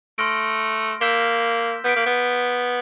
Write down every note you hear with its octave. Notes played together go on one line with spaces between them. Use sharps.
A3 C6 F6 A#6 D7
A#3 E6 G6 B6 E7 G7
B3 G6 B6 D7
A#3
B3